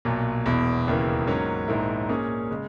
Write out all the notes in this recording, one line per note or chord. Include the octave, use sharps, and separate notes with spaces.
B1 A#2 F#3
E1 E2 B2
E1 D#2 C#3 E3 A#3
G#2 F#3 A#3 C#4
A#1 G#2 D#3 A#3 E4
A#2 A#3 C#4 G#4
C#3 G#3